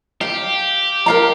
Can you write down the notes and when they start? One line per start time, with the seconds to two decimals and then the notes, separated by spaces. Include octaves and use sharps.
0.21 G4 F5
1.06 A#4 F5 A#5